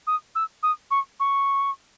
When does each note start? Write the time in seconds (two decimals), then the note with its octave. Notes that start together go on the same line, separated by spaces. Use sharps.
0.07 D#6
0.35 E6
0.63 D#6
0.91 C#6
1.20 C#6